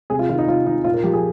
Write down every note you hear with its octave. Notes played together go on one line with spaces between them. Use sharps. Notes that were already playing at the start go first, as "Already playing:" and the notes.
C3 G#4
F4
D#3 F4
D#4
C3 F4
D#3 D#4
A#2 F4
A#4
F3 G4
G#4